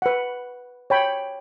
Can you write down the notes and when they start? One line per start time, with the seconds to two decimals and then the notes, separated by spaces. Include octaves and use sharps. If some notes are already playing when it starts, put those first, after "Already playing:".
0.02 B4 F#5
0.90 C#5 G5 B5